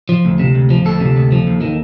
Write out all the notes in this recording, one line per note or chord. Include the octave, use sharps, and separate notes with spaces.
F3
D2
C3
D2
F3
D2 A4
C3
D2
F3
D#2
D#3